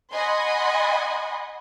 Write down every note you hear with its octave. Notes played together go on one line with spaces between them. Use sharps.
D#5 F#5 G#5 B5 C6